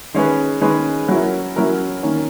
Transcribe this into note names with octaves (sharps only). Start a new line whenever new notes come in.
D#3 G#3 C#4 G#4 B4
D#3 G#3 C#4 G#4 B4
F#3 C#4 E4 A#4
F#3 C#4 E4 A#4
D#3 A#3 C#4